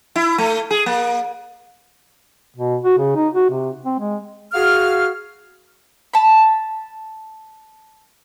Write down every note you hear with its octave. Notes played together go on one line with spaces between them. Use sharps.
E4
A3
G#4
A#3
B2
F#4
C#3
D#4
F#4
C3
C4
G#3
F#4 G#4 F5 F6
A5 B5